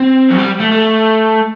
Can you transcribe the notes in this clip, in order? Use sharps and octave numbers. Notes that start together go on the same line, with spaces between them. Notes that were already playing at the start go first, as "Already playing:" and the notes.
Already playing: C4
F#3
G3
A3
A3